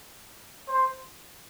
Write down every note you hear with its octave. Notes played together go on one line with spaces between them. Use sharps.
C5